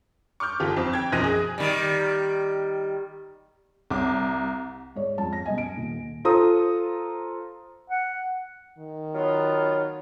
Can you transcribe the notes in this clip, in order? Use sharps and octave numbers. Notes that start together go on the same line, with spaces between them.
C#6 D6 F6 G6
G1 F4 G4
F2 C4
G5 G#6
B1 F#2 F3 F#6 A#6 D#7
G#4
D#3 G3
C2 D6
G#2 C#5 D5
F2 G#2 A5
A#6
F#2 B2 D#5 G#5
D7
D#1
F4 A4 C5 A#5 D#6
F#5
D#3
F#3 B3 F4